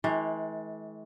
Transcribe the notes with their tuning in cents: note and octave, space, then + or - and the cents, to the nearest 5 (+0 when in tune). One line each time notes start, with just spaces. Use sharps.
E3 -35 G#3 +45